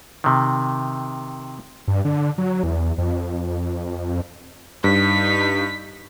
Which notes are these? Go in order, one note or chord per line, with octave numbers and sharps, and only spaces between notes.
C3 D#3
G2
D3
F#3
E2
F2
G2 D#4 B6